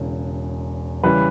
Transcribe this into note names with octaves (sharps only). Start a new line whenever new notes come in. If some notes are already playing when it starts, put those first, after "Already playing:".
Already playing: E1 E2 C#3
C#3 E3 G3 B4